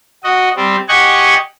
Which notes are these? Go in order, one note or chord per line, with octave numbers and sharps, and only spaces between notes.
F#4 D#5
G3 C4
G4 D#5 F#5 G#5 C#6